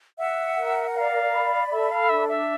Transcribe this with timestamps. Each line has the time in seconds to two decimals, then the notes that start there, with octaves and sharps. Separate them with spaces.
0.18 E5 F#5
0.57 A#4
0.95 D5 F5
1.33 B5
1.71 A4 E5
1.91 F5
2.09 D4 E5
2.29 E5